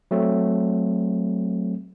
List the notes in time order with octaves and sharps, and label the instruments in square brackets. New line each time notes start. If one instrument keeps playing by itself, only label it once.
[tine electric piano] F#3 A3 C4